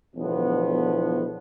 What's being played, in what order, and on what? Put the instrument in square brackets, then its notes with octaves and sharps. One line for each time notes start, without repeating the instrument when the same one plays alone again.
[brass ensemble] B1 E2 A2 D3 F3 B3